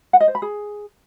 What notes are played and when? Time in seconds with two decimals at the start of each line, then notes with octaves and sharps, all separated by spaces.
0.13 F#5
0.20 D#5
0.28 C5
0.35 B5
0.42 G#4